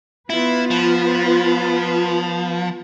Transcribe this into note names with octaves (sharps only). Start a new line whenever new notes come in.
B3 E4 F4 B4
F3